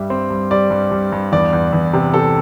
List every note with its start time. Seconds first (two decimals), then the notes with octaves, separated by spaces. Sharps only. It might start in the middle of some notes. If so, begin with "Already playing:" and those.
Already playing: G2 G3 E5
0.10 C4
0.30 G2
0.51 G3 D5
0.71 G2
0.92 G2
1.12 G2
1.32 E2 D5
1.53 E2
1.73 E2
1.93 C3
2.14 C3 A4